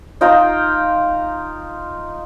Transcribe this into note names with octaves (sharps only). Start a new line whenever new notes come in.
D#4 F4 G5 A#5